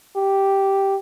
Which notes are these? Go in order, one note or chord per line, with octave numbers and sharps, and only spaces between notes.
G4